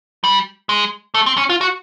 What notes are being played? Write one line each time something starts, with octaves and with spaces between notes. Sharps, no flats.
G3
G#3
A3
C4
C#4
F4
F#4